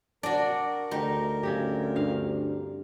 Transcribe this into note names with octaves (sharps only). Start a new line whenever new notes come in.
D4 F#4 A#4 D5
D2 D#4 G4
C#3 C4 G4
G2 F5